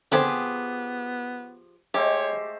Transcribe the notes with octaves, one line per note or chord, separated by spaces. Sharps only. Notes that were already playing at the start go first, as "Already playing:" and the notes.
D3 F3 B3 C4 G4 G#4
G#3 A3 G4 C5 C#5